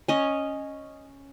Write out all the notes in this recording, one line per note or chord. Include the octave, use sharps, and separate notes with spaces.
C#4 D#5